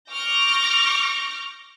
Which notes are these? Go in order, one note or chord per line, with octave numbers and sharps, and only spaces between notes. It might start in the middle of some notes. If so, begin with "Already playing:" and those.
C#6 D6 F6 G6 A#6